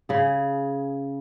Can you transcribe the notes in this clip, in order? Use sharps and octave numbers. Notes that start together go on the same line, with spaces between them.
C#3 G#4